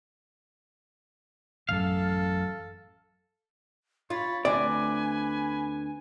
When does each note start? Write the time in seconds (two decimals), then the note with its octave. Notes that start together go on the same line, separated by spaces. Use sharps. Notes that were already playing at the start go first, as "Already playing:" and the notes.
1.69 A1 F#2 A4 F5
4.10 F4 C#5 B5 A6
4.45 D2 C4 B4 D5 G#5